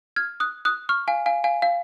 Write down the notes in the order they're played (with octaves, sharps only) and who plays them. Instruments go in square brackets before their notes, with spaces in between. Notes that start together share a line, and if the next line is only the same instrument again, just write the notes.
[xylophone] F6 G#6
D#6 F#6
D#6 F#6
C#6 F6
F5 G#5
F5 G#5
F5 G#5
F5